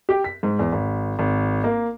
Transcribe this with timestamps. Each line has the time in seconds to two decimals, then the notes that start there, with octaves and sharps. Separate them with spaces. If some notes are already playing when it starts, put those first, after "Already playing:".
0.09 G4
0.24 B6
0.43 G#2
0.59 E2
0.72 G#1
1.19 G#1
1.64 A#3